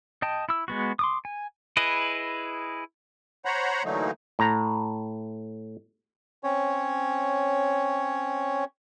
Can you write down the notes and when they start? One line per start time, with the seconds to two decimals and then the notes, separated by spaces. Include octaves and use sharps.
0.22 D#5 G5 A5
0.49 E4 E6
0.68 G#3 B3 F#4
0.99 C6 D6 D#6
1.25 G#5
1.77 E4 G#4 B4 D#5
3.45 C5 C#5 F#5 A#5 B5
3.85 D3 E3 F#3 A3 A#3 D#4
4.39 A2 A#5
6.43 C4 C#4 C#5